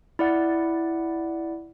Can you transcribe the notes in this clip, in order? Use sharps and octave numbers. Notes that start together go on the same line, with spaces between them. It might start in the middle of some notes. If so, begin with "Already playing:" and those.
E4 D5 F#5